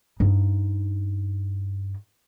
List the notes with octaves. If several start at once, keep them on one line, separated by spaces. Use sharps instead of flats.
G2 D#4